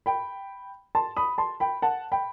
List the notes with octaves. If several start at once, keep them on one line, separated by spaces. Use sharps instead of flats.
G5 B5
A5 C6
B5 D#6
A5 C6
G5 B5
F#5 A5
G5 B5